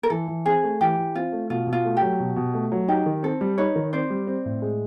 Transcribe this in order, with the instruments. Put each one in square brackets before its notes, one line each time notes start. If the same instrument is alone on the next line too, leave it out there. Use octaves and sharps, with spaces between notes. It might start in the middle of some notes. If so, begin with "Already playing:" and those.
[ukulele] A#4
[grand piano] E3 [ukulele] A4
[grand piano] E3
[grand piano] C4 [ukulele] G#4
[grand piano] A3
[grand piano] E3 [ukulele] G4
[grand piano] E3
[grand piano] C4 [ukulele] F4
[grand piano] A3
[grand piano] B2 [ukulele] F4
[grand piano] B2
[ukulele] F4
[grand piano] A3
[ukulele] G4
[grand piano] F#3
B2
B2
A3
F#3
[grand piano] D#4 [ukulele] G4
[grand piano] D#3
[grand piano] C4 [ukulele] A4
[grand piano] G3
[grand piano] D#4 [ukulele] B4 C#5
[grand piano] D#3
[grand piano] C4 [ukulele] C5 D5
[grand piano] G3
C4
A2
G#3